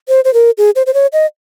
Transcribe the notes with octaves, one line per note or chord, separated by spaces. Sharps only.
C5
C5
A#4
G#4
C5
C5
C#5
D#5